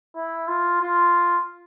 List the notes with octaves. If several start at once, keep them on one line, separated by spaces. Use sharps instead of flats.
E4
F4
F4